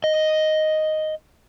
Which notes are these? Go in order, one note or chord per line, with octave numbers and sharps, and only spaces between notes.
D#5